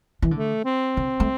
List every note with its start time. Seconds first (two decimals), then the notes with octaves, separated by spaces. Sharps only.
0.22 E3
0.31 D3 A3
0.65 C4
0.97 D3
1.20 A3